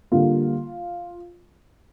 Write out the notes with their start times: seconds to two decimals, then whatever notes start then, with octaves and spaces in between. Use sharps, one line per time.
0.12 D3 G3 A#3 F4